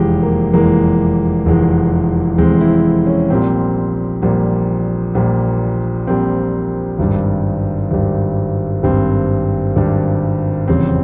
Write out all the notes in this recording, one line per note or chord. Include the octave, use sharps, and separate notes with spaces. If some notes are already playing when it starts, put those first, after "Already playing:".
Already playing: F1 E2 E3 G#3 G4
A#3
F1 E2 E3 G#3 A#3
F1 E2 E3 G#3
F1 E2 E3 G#3 C4
E4
C#4
A#1 A#2 G3 C4
A#1 A#2 G3
A#1 A#2 G3
A#1 A#2 G3 C4
G#1 G2 G3
G#1 G2 G3
G#1 G2 G3 C4
G#1 G2 G3
F1 E2 C#3 G3 C4